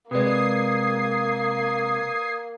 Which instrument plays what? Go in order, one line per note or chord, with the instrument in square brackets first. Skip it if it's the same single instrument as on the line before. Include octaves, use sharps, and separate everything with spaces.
[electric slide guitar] C3 G#3 [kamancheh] A#3 [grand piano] B4 D5 [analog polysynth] D#6 G#6 C7